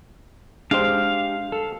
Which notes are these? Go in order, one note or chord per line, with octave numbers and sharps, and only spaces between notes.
G#3 D4 G4 C5 F5 G5
A4